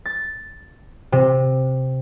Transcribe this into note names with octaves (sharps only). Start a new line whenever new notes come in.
A6
C3